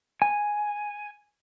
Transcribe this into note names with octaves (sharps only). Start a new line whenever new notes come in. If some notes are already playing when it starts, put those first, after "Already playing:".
G#5